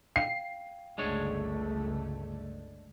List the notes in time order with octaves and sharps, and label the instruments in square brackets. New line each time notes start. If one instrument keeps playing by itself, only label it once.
[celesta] F5 G5 [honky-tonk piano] C7
[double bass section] G1 C#2 A3 [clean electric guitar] G#3 D4 C#5